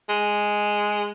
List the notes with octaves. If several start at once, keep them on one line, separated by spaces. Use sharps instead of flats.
G#3